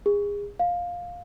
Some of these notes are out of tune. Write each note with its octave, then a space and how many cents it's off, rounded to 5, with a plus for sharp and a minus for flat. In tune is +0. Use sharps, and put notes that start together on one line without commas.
G#4 -30
F5 +10